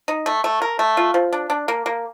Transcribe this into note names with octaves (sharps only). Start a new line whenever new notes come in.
D#4
A3
A3
A#4
A3
F4
F3
D4
D4
A#3
A#3